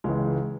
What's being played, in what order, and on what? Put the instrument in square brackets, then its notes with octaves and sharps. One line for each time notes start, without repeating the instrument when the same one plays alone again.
[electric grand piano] C#2 C#3 E3 [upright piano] G#3